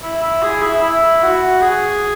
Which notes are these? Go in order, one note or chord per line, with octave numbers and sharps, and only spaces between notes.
E4
E4
G#4
E4
E4
F#4
G#4